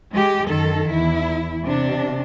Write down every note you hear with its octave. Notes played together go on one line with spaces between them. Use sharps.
G#3 G4
F#2 D#3 A4
E2 E4
C3 D4